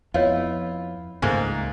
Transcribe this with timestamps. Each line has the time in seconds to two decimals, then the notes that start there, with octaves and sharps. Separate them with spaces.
0.14 F2 B3 E4 F4 C#5 D#5
1.22 C#2 G#2 A3 A#3